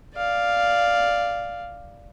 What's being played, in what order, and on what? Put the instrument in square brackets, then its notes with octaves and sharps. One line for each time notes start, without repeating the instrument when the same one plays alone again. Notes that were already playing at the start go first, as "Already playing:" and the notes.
[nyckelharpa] D5 F5